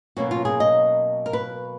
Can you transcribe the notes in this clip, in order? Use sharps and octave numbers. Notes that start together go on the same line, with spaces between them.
B2 F#3 A#3 C#4 F#4
F4
G#4
D#5
A#4
B4